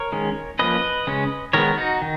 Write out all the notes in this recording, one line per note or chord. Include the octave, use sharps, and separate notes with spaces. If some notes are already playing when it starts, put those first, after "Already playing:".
Already playing: A#4 C#5
D#3 G#3 C#4
F3 A#3 C#4 B4 D#5
C#3 G#3 C#4
D#3 G#3 B3 A#4 C#5
D#4 F#4
D#3